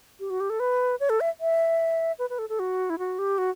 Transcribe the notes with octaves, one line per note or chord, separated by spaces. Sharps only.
G4
F#4
G4
A4
B4
C#5
A4
E5
E5
B4
B4
A4
A4
F#4
E4
F#4
G4
F#4